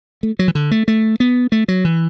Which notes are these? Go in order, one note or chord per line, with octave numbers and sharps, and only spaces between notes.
A3
F#3
E3
D3
A3
A3
B3
A3
F#3
E3